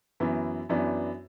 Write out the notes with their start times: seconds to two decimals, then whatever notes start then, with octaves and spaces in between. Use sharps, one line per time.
0.20 F#2 E3 B3
0.69 F#2 E3 B3 D4